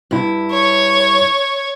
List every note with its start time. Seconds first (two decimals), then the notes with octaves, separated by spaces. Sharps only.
0.11 G2 E4
0.51 C#5